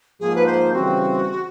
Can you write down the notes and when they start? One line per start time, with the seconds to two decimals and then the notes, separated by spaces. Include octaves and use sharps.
0.20 G#2 F3 A#3 G#4
0.36 B4
0.46 C5
0.72 C#3 E3 G3 C4 F#4